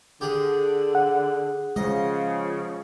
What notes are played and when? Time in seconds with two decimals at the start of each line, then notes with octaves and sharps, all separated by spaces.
0.21 D3 G4 G#4
0.95 F#5
1.76 C#3 F3 G#3 D#5